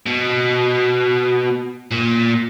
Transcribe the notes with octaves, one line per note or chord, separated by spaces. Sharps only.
B2
A#2